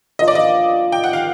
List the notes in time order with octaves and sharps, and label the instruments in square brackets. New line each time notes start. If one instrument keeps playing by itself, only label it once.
[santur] F3 A#3 D4 [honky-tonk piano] D#5
[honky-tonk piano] D5
D#5
G5
F#5
F5